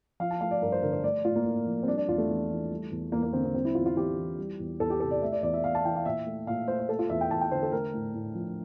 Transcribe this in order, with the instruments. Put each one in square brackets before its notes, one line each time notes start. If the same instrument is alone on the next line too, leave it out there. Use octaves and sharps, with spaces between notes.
[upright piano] F3 F5
A5
A3 F5
D5
G2 A#4
C5
D3 A#4
C5
A3 D5
A2 F4
A#3
A2
F3
C4
G3 D4
D4
E2 F4
A3
E2
E3
G3
E2
E2 A#3
A#3
D3 C4
C4
G3 C4
E4
E2 F4
F4
E2 G4
E3
G3
E2
E2 A4
G4
C3 A4
D5
A3 E5
D5
E2 D5
E5
E2 F5
A5
E3 G5
F5
A#2 E5
A3
A#2 F5
A3 C5
C5
A3 A4
F4
E2 E5
G5
E2 A5
G5
D3 C5
A4
A3 A#4
A2
A2
F3